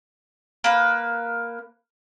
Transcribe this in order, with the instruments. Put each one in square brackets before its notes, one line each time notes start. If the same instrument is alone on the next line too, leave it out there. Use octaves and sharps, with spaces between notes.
[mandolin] A#3 B4